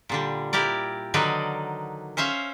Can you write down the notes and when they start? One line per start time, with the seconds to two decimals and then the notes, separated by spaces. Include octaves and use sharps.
0.09 A#2 D3 G3
0.53 E4 G4 A#4 D5
1.14 D3 D#3 F#3 D#4 B4 D5
2.17 C#4 C5 C#5 E5 F5